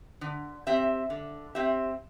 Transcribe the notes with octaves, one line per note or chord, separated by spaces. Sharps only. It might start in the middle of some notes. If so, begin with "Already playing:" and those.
D3
C4 G4 E5
D3
C4 G4 E5